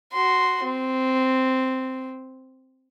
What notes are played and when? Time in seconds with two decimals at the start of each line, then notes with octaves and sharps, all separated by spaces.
0.13 F#4 C6
0.63 C4